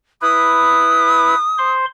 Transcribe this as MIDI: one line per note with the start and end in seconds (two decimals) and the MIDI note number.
0.22 1.35 64
0.22 1.35 71
0.22 1.71 87
1.58 1.86 72
1.58 1.86 84